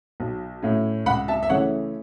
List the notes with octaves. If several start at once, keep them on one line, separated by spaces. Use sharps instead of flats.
B1
A2 A3 C#4
C#2 F#5 B5
E5 A5
E5
C#3 E3 A3 C#4 C#5 F#5